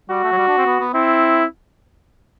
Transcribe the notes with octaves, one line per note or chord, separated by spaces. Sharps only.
G3 F#4
A3
F#3
G3
D4
C4
B3
B3
C4 E4